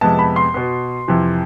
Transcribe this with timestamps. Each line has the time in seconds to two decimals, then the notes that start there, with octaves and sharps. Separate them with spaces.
0.01 F2 C3 G#3 B3 A5
0.19 B5
0.36 C6
0.54 B2 B3
1.08 F2 C3 E3